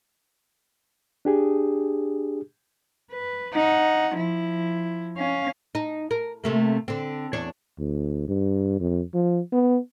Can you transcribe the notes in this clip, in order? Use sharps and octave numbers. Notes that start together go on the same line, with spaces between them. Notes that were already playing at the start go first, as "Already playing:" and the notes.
D4 G4 G#4
B4
D#4 F#5
F3 E4
C#4 F5
D#4
A#4
C3 A3 A#3
D3 C4
E2 D4 C#5
D2
G2
F2
F3
B3